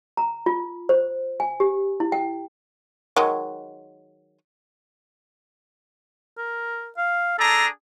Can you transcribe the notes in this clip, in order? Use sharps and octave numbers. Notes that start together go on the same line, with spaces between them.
A#5
F4
C5
G#5
G4
E4
G5
D#3 F#3 G#3
A#4
F5
D4 G#4 A4 A#5